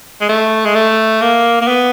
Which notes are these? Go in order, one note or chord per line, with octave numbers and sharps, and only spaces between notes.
G#3
A3
G#3
A3
A#3
A#3
B3